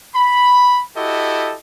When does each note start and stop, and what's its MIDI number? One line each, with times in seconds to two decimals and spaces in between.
0.14 0.81 83
0.96 1.55 64
0.96 1.55 66
0.96 1.55 67
0.96 1.55 69
0.96 1.55 75